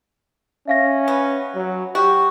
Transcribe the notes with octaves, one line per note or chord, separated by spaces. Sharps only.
C#4 E5 F5 A#6
B3
F#3
F#4 G4